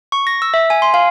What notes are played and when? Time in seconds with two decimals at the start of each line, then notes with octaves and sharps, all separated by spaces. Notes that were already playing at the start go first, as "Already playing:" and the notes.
0.12 C#6
0.27 A#6
0.42 E6
0.54 E5
0.70 G#5
0.82 C6
0.94 F5